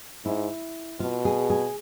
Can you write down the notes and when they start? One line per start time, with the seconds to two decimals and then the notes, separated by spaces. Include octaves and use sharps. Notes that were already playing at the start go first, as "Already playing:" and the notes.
0.25 G#2 E4
1.00 B2 F4
1.25 G#4
1.50 G#4